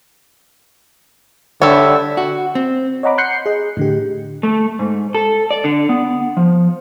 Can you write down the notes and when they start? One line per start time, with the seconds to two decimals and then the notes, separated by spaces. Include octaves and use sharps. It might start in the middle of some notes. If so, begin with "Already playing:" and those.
1.62 D3 G3 E4 C#5 E5
2.17 F#4
2.55 C4
3.03 C#5 D#5 F#5 A#5 B5 D6
3.18 C6 F#6 G6 C7 C#7
3.46 G#4 D#5
3.77 A2 D3 G4
4.43 A3
4.79 G#2
5.15 A4
5.51 D5
5.64 D3
5.89 B3
6.37 F3